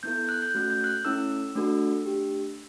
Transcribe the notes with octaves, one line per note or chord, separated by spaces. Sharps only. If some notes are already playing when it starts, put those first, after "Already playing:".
B3 E4 A4 G6
F#6
G6
A3 C#4 F#4 A4 F#6
G6
F#6
A3 C#4 E4 A4 E6
A3 D4 F#4 A4
A3 D4 G4